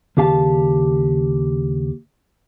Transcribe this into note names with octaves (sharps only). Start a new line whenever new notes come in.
D#2 C#3 G4 F5 A5